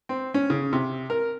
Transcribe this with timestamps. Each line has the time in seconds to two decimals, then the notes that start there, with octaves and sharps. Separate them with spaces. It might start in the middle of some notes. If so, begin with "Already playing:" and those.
0.09 C4
0.34 C#4
0.50 C#3
0.73 C3
1.10 A#4